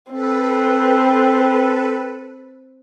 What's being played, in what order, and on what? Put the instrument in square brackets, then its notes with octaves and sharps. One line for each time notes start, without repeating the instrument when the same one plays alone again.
[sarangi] C4 [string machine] A4 B4